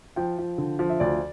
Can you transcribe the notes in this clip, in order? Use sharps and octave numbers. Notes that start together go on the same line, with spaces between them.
F3 G5
F3
D3
F3
E5
D2 D5